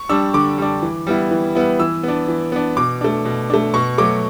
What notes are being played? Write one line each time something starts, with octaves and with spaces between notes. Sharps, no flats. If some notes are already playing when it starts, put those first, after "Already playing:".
Already playing: C#6
G3 D4 E6
D3 D6
G3 D4
E3
G3 B3 E4
E3
G3 B3 E4
E3 E6
B3 D4
E3
B3 D4
B2 D6
A3 D4
B2
A3 D4
B2 C#6
F#3 A3 D6